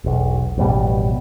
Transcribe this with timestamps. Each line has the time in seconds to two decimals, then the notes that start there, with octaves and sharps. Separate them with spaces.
0.04 E1 B1
0.58 A1 F2 B2 G3